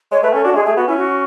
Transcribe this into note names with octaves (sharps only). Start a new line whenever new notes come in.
G#3 C#5
A3 B4
C#4 A4
D4 F#4
G#3 G#4
A3 G#4
B3 F#4
C#4 E4
F#4